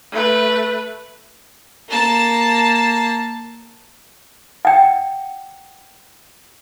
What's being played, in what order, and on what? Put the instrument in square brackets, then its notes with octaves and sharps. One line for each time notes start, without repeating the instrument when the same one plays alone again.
[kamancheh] A3 B4
[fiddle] A#3 A5
[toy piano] F#5 G5